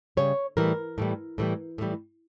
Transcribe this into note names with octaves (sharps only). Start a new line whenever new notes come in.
C#3 G3 C#5
A2 E3 G3 A#4
A2 E3 G3
A2 E3 G3
A2 E3 G3